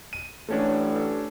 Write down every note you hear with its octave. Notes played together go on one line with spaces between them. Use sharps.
D#7
A1 A3 C#4 D4